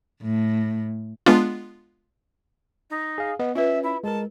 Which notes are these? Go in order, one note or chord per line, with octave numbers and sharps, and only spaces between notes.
A2
G#3 B3 D4 F4
D#4
G#4 F5
B3 D#5
C#4 F4 B4 E5
E4
G#3 A#4 A5